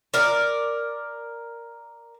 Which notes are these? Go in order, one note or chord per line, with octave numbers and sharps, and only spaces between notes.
A#4 D5